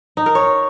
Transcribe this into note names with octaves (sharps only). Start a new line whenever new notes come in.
D#4
A#4
C#5